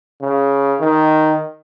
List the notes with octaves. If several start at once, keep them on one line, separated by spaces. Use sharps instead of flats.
C#3
D#3